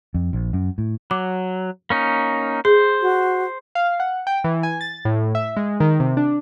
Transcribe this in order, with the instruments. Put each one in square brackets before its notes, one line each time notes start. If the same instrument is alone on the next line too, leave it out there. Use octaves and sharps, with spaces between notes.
[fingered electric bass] F2
A#1
F#2
A2
[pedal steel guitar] F#3 [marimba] D6
[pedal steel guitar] A#3 C#4 D#4
[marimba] G#4 [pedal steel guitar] C5
[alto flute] F#4
[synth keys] F5
F#5
G5
E3
G#5
A6
A2
E5
G#3
D#3
C3
D4